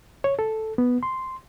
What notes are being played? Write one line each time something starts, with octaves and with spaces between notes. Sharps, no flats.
C#5
A4
B3
C6